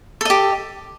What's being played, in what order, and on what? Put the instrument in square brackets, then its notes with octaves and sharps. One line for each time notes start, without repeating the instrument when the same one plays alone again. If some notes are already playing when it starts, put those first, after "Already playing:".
[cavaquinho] A4
D#5
G4